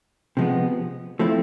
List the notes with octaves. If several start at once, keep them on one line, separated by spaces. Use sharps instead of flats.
C3 F3 G#3 B3
F3 A3 C4 E4